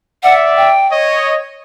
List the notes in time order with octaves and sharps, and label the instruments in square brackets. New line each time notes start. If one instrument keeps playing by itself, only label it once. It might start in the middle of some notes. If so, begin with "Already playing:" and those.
[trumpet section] D5 E5 [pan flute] F#5
[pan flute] G5
[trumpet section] C#5 D#5